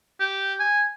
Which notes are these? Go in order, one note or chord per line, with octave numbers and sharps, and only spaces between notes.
G4
G#5